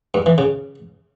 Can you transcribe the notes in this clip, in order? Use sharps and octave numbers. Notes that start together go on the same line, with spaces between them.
G2
E3
C#3